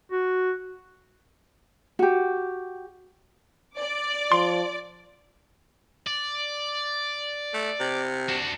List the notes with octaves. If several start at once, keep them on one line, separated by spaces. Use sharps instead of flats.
F#4
F#4 G4
D5 D6
F3 C6
D5
A3
C3
D4 F#4